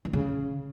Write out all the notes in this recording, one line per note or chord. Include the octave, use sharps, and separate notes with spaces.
E3
C#3